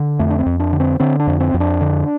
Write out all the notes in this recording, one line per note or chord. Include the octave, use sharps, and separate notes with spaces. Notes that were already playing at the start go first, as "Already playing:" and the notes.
Already playing: D3
F2 A3
D4
C4
F2
D4
D3
C4
D3 C4
D4
F2
C4
F2
D4
D3